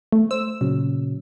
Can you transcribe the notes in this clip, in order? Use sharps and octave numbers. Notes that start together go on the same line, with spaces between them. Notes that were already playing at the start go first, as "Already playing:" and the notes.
A3
C5 E6
A#2 C#3 F#3